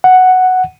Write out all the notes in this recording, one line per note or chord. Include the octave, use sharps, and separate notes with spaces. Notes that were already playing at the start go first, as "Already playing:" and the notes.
F#5